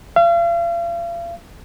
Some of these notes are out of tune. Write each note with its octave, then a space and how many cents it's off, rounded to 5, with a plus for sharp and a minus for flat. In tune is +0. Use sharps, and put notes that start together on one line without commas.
F5 -40